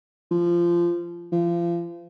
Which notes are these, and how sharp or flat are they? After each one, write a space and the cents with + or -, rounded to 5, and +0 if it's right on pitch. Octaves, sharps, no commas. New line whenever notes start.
F3 -20
F3 -30